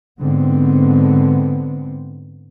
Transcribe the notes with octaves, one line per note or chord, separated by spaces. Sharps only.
G#2 D3 B3 C4